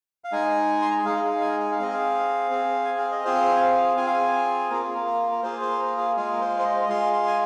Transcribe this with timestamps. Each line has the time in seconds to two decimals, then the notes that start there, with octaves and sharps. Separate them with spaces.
0.24 F5
0.32 G#3 D#4 G#4 G#5
0.82 C6
0.91 A#5
0.98 G#5
1.05 G#3 D#4 G#4 F5
1.16 D#5
1.24 F5
1.41 G#5
1.60 G#5
1.72 F5
1.79 C4 G#4 D#5
1.94 F5
2.51 C4 G#4
2.85 G#5
2.98 F5
3.11 D#5
3.24 C4 F4 G#4 C5
3.57 G#5
3.61 F5
3.97 C4 F4 G#4 G#5
4.06 F5
4.14 G#5
4.70 A#3 F4 G#4 A#4
4.82 G#4
4.95 A#4
5.07 A#4
5.32 A#4
5.43 A#3 F4 G#4 C5
5.61 C5
5.80 A#4
5.98 G#4
6.16 G#3 F4 G#4
6.32 A#4
6.41 C5
6.60 C5
6.64 D#5
6.89 G#3 F4 G#4 C6
7.13 C6
7.27 G#5